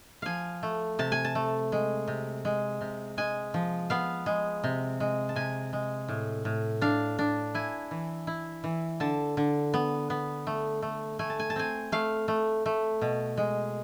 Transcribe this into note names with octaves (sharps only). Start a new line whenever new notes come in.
F3 F5 G#5
A3
C3 A5
G#5
A5
A3
G#3
C3
G#3
C3
G#3 G#5
F3
B3 F5
G#3
C3
G#3
A5
C3 G#5
G#3
A2
A2
D4 F5
D4
E4 G#5
E3
E4
E3
D3 A5
D3
B3
B3
A3
A3
A3 G#5
A5
G#5
A5
C4 G#5
A3 F5
A3
A3
B2
G#3